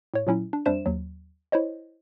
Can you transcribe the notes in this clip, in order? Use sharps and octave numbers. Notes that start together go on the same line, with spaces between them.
A2 C#5
A#2 F#3 C#4 E4
D4
F2 G3 D4 C5 E5 E7
D#2 F#3
E4 C5 C#5 D#5